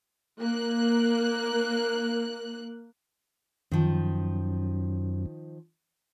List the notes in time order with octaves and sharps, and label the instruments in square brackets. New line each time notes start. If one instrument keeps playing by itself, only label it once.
[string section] A#3 F#6
[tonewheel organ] F#2 [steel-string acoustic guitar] D#3 F3